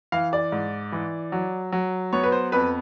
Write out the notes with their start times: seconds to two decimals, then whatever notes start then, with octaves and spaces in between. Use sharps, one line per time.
0.12 E3 F5
0.33 D5
0.52 G#2
0.92 E3
1.32 F#3
1.72 F#3
2.13 B3 C#5
2.24 B4
2.32 C5
2.52 F2 B4